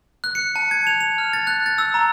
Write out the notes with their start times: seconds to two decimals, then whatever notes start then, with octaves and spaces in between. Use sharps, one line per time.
0.24 F#6
0.35 C#7
0.56 A5
0.71 G#6
0.87 F7
1.00 F7
1.18 F6
1.33 A6
1.47 F#6
1.66 A6
1.78 E6
1.94 A#5